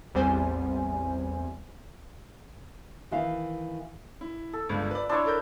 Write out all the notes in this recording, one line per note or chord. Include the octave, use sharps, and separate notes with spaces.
A1 E2 G3 C4 C5 G#5
D#3 E3 F5
E4
A4
G1 C#2 G2
B4 D5
D4 E4 C#5 C6 D6
A4 A#4 G6